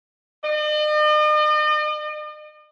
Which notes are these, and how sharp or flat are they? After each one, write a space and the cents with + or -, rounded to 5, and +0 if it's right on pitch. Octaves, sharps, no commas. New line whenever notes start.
D#5 -45